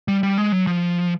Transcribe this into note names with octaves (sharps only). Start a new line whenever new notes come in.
G3
G3
G#3
F#3
F3